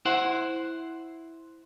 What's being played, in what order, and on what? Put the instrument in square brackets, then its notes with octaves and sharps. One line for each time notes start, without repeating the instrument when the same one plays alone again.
[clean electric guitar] E4 C5 F#5